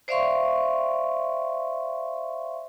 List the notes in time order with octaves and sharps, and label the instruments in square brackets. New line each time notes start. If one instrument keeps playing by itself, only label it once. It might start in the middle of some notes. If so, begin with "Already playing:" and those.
[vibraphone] C5 D5 E5 F5 C6 C#6